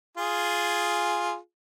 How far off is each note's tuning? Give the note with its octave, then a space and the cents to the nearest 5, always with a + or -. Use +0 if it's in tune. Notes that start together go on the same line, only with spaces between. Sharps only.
F4 +0 G#4 +0